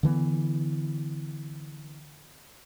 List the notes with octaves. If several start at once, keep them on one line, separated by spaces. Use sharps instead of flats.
D3 E3 A#3 B3